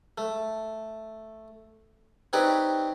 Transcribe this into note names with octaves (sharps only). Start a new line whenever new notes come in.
A3
C4 D#4 G4 B4 C#5 D5